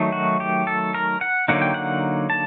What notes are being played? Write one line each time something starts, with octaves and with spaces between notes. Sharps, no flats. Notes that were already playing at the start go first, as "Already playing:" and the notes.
Already playing: D#3 F#3 A3 D#4
F#4
G4
A4
A#4
F#5
D3 F#3 A#3 D#4 F#5
G5
F#5
A5